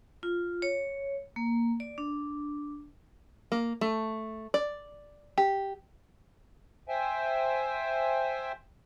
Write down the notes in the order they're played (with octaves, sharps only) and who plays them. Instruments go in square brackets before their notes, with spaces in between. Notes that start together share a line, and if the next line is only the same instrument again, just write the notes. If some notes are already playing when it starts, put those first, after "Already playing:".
[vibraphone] F4
C#5
A#3
D5
D4
[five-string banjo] A#3
A3
D5
G4
[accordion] C5 E5 G5 G#5